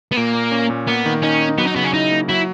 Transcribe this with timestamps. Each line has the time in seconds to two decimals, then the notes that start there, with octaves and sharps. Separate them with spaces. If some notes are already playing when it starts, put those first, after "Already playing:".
0.12 B3
0.17 A#2 A#3
0.35 A#2
0.52 C#4
0.70 A#2
0.87 A#3 B3
1.06 D#3
1.23 C#4 D#4
1.41 D#4
1.58 F#3 B3
1.67 D#4
1.76 C#3 B3
1.84 C#4
1.94 D#4 E4
2.11 A#3
2.29 F#3 E4